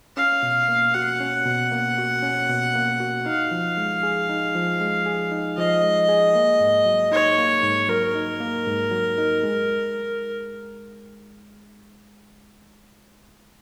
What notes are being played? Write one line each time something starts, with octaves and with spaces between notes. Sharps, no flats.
C#4 F5
B2
A#3
F#4 F#5
C#4
B2
A#3
F#4
C#4
B2
A#3
F#4
D#4 F5
F3
G#3
G#4
D#4
F3
G#3
G#4
D#4
F3 D#5
G#3
G#4
A#3
G#2
F#3
D#4 C#5
A#3
G#2
F#3 A#4
D#4
A#3
G#2
F#3
D#4
G#3